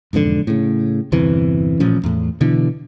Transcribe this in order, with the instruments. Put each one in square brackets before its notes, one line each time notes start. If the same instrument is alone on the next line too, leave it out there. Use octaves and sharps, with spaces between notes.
[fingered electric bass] E1 F2 G#2 D3
A2 C#3
G1 E2 C3 E3
A1 A#2 F3 C#4
E2 A2
B2 D3 E3